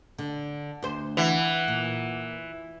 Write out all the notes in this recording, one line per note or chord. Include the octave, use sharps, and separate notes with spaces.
D3
D2 C5
E3 F#5
A#2